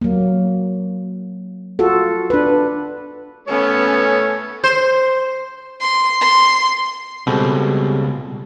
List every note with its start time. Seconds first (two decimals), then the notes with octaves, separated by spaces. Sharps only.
0.01 F#3 A#3
1.79 F4 F#4 A4
2.30 D4 B4
3.48 A3 B3 C#4 C#5
4.64 C5
5.81 C6
6.21 C6
7.27 C#2 B2 G3 C4 G#4 A4